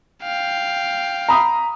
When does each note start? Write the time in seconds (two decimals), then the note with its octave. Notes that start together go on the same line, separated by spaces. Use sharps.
0.23 F5 G5
1.29 A#5 B5 D#6